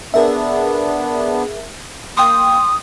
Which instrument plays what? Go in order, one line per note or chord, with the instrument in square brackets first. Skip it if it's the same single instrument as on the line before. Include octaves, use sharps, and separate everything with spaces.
[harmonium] B3 D4 [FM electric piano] G#4 A#4 E5
[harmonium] A#3 [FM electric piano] G5 C6 [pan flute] D#6